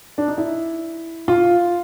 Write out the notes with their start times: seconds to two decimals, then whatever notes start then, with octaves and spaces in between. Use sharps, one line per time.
0.18 D4
0.28 D#4
0.38 E4
1.28 F4